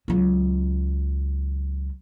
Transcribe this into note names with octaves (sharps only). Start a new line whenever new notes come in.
C#2 F#3